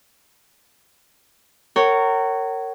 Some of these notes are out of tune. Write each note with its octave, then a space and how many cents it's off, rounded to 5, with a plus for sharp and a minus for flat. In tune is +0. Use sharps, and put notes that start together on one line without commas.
A#4 -25 C#5 +0 F#5 +45